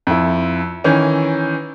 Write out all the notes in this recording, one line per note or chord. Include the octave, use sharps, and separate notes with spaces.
F2 E4
D#3 E3 C#4